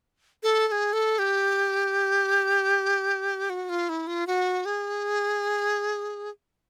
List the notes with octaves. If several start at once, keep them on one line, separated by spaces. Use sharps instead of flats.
A4
A4
G#4
A4
G4
F#4
F4
E4
F4
F#4
G#4